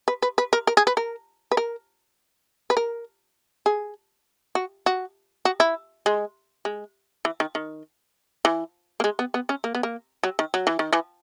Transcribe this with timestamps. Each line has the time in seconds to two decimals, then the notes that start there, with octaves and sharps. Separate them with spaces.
0.08 B4
0.22 B4
0.38 B4
0.53 A#4
0.67 A#4
0.77 G#4
0.87 B4
0.97 A#4
1.51 B4
1.57 A#4
2.70 B4
2.77 A#4
3.66 G#4
4.55 F#4
4.86 F#4
5.45 F#4
5.60 E4
6.06 G#3
6.65 G#3
7.25 E3
7.40 D#3
7.55 D#3
8.45 E3
9.00 A#3
9.04 G#3
9.19 B3
9.34 B3
9.49 C#4
9.64 A#3
9.75 B3
9.83 A#3
10.23 F#3
10.39 D#3
10.54 F#3
10.67 E3
10.79 D#3
10.93 E3